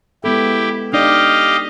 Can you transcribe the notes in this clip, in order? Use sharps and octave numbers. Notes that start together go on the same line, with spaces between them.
G#3 B3 E4 G4 A4
D4 D#4 G4 D5 D#5 F5